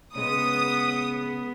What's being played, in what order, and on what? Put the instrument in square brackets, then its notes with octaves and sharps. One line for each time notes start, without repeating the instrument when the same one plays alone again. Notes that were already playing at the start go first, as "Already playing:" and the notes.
[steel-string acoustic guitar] C#3 G#3 [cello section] B3 [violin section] D#6